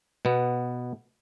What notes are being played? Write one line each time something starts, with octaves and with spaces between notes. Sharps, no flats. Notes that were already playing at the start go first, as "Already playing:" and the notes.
B2 B3